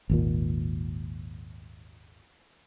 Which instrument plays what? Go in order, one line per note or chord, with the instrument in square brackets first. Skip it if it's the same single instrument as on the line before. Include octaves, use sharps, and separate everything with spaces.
[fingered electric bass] G#1 D#2 A#2